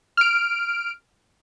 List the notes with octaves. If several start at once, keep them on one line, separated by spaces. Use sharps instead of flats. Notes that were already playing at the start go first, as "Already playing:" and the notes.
F6 D7